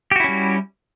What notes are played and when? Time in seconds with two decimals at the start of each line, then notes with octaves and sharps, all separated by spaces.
0.11 G4
0.16 F#4
0.20 E4
0.24 C#4
0.28 G3